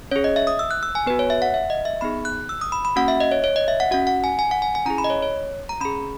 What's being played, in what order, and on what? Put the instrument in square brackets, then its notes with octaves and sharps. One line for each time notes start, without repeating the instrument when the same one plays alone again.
[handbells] C#4 G#4 C#5
D#5
E5
D#6
E6
F#6
E6
G#5
B3 F#4 B4
C#5
E5
F#5
E5
D#5
E5
B3 D#4 G#4 B5
F#6
E6
D#6
B5
B5
A#3 C#4 F#4 F#5
E5
D#5
C#5
C#5
D#5
E5
F#5
C#4 F#4 F#5
F#5
G#5
G#5
F#5
G#5
G#5
C#4 E4 G#4 A#5
B5
D#5
C#5
C#5
A#5
C#4 G#4 B5